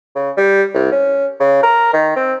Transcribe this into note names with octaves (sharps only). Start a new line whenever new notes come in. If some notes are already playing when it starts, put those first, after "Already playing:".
C#3
G3
C2
C#4
C#3
A#4
D#3
C4